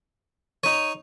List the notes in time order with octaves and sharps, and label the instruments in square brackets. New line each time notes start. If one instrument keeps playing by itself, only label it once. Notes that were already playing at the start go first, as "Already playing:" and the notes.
[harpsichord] D#4 C#5 [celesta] D#7 F7